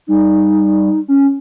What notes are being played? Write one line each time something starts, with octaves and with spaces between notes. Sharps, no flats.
G3 D#4
C#4